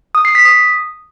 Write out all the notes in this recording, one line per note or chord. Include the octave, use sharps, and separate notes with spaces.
D#6
C7
B6
D#6